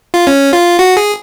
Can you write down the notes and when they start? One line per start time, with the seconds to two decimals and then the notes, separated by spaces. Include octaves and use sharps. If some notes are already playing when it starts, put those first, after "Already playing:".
0.14 F4
0.27 C#4
0.53 F4
0.79 F#4
0.97 G#4